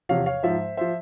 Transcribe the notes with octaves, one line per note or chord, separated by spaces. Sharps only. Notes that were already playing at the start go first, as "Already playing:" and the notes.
E2 C3 F3 C#5 F5
C#5 F5
G#2 F3 C5 E5
F3 C5 E5